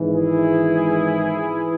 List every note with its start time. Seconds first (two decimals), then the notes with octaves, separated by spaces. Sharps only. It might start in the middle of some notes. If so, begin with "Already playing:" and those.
Already playing: G#1 G#2 E3
0.13 E4 G#4
1.46 E3